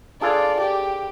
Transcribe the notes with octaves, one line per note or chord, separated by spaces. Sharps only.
D4 F4 G#4 A4 D5
G4